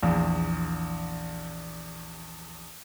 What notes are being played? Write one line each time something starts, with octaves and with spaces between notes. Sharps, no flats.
A#1 E2